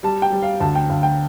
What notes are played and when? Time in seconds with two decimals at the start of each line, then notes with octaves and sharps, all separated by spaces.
0.03 G3 A5
0.22 G5
0.32 G3
0.42 F5
0.60 D2 A5
0.75 G5
0.89 D2 F5
1.03 G5